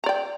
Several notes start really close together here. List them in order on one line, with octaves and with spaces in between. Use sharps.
A#5 D5 G5